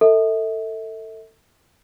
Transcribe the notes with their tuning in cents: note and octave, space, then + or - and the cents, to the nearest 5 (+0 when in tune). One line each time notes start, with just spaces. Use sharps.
A4 +25 E5 -40